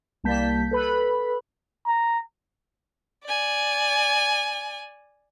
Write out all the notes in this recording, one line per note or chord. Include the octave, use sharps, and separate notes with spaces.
C2 G3 A#3 A5 G6 B6
A4 B4 B5
A#5
D5 G#5